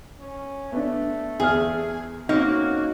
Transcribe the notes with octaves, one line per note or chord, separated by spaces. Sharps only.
C#4
A3 B3 D4
E2 G#4 F6
A#3 C4 C#4 D#4 F#4